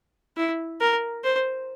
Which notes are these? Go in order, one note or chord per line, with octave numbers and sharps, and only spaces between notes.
E4
A#4
C5